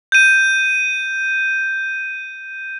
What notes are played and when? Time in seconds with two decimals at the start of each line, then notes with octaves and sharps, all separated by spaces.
0.12 G6 D#7